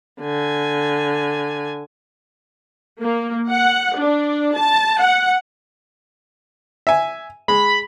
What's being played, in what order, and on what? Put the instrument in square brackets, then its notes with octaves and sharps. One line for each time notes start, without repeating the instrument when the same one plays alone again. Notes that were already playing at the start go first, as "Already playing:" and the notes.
[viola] D3 G#5
[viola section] A#3
F#5
D4
A5
F#5
[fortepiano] E5 G#5
[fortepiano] G#3 [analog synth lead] B5